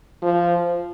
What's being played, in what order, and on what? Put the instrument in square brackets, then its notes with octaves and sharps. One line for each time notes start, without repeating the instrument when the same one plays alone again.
[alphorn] F3